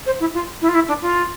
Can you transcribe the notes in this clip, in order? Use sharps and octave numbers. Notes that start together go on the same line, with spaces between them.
C5
E4
F4
E4
F4
E4
D4
F4